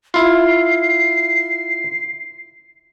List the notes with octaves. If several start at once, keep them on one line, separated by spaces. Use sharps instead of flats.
E4 F4 C7